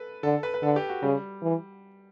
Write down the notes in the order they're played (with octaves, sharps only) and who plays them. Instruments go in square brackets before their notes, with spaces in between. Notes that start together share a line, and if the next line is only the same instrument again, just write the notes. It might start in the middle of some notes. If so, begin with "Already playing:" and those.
Already playing: [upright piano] A4 B4
[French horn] D3 [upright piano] A4
[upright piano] B4
B4
[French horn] D3 [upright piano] A4
[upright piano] G4
F#4
[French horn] C#3 [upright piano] G3
[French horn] E3